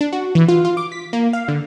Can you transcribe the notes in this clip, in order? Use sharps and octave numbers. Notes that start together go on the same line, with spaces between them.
D4
F#4
E3
F4
F4
D6
B6
A#3
F5
D3